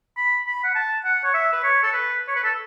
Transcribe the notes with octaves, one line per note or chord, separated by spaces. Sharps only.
B5
B5
F#5
A5
F#5
C#5
E5
B4
C#5
A4
B4
C#5
B4
A4